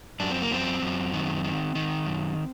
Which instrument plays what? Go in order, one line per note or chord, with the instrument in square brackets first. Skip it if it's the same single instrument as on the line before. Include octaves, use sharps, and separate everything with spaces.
[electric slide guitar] F#2 D4
C4
A#3
F#2 C4
F#2
D#3
D#3
D#3
F#2